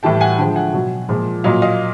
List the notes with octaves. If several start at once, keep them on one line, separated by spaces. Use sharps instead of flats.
A2 E3 G3 G5 A5
F#5 G#5
D3 F3 G#3 G5 A5
F#5 G#5
B2 F#3
A#2 F3 G#3
A#2 F#3 D#5 F5
D#5 F5